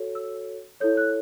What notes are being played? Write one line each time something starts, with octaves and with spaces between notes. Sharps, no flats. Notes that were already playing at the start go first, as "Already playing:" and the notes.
Already playing: F#4 A4 C#5
E6
E4 A4 C#5 G6
F#6